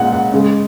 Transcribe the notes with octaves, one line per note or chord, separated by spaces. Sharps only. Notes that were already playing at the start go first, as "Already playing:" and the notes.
Already playing: A#2 G#3 F#5
F#5
C#3 G#3